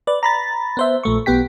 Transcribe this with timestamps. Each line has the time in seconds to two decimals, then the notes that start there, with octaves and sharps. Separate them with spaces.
0.07 B4 D5
0.23 A#5 B5 A6
0.77 B3 C5 E5
1.03 A#1 A3 C#6
1.26 B1 B3 G4 G5 B6